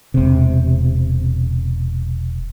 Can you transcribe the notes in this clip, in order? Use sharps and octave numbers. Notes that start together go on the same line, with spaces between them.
E1 C3